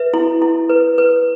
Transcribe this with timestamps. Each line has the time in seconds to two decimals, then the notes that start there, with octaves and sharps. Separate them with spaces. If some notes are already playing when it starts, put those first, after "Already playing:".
Already playing: B4 E5
0.14 E4
0.42 E4
0.69 B4
0.98 B4